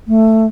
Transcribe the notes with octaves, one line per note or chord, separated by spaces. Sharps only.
A3